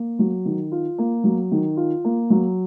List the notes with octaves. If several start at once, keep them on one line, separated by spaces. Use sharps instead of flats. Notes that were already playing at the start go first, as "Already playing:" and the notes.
Already playing: A#3
F#3
D#3
F4
A#3
F#3
D#3
F4
A#3
F#3